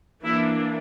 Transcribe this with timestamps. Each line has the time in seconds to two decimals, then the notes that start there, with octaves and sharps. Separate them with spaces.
0.24 E3 A#3 D4 E4